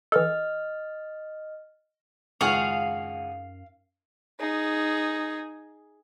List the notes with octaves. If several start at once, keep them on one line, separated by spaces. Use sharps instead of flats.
E3 A4 D#5 F6
G#1 C#2 F#2 G#4 F5 F#5 C#6 D#6
D#4 G#4